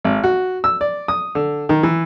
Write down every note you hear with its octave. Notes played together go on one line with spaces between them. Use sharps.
G#1
F#4
E6
D5
D#6
D3
D#3
E3